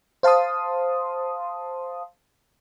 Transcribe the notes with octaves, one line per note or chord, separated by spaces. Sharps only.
C5 F5 A5 C6 D#6